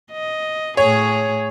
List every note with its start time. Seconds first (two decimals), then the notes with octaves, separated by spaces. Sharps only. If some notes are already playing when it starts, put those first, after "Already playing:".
0.11 D#5
0.77 A2 G#4 C#5